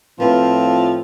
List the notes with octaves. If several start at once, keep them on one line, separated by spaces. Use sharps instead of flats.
A2 F3 C4 F4 B4